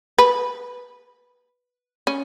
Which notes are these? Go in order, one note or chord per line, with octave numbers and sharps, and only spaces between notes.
B4
C#4